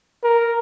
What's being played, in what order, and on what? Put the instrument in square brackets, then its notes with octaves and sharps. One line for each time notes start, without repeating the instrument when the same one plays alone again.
[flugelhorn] A#4